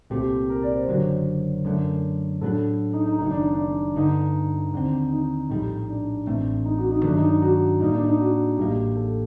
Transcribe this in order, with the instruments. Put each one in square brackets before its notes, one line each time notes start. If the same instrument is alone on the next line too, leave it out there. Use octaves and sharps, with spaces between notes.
[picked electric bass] C2 A#2 A3 C4 [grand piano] G4
[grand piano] A#4
D5
C5
[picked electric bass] F#1 F#2 D3 F#3
[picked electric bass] F#2 D3 A3 [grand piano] A#4
[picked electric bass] A2 F#3 A3 D4 [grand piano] A4
[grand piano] D#4
D#4
[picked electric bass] F#1 F#2 D#3 [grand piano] D#4
[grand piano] D4
D4
[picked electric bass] G1 G2 D3 [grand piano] D#4
[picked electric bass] D#2 D3 F#3 C4
[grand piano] D#4
[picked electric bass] A#1 A2 G3 [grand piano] D#4
[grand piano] D4
[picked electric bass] A1 A2 A3 C4
[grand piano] D#4
F#4
D#4
[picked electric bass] G2 D#3 F#3 A3 [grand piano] D4
[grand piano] D#4
D#4
F#4
[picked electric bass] A2 G3 A#3 [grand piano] D#4
[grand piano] D4
D#4
F#4
[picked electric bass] A1 A2 G3 A#3 [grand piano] G4
[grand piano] A4